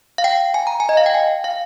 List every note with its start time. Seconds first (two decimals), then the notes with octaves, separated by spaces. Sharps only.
0.18 F5
0.24 G5
0.54 G#5
0.67 A#5
0.80 G#5
0.89 D#5
0.97 F5
1.06 G5
1.14 G#5
1.44 F5